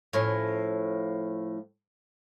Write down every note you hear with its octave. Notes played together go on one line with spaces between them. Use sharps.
A2 F3 C#4